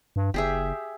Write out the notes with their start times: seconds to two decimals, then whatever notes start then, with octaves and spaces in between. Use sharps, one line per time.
0.16 G2
0.34 F#1 G4 G#4 E5